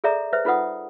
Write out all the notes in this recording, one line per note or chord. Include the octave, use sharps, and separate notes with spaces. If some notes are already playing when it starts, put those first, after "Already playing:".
G#4 A4 D5 E5 A#5
B4 C5 E5
D#4 F4 A4 B4 F#5 D#6